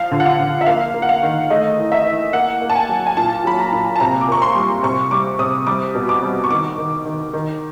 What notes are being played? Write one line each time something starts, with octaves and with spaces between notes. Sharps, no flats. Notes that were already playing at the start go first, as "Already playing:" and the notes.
Already playing: F3 F5
D3
F#5
F5
D3
E5
A#3 F5
A#3
F#5
F5
D#3
A3 D#5
E3
E5
E3
A#3 F#5
A#3
A5
G#5
F#3
G#5
A#2 A5
F#3 B5
A#5
A#2
A5
C3 A#5
D6
A#3 C#6
C6
G3
C3 C#6
G3 D6
C3 D#6
G3 D6
B2
D6
G3
C#6
D#3 D6
D#3
D#3
D#3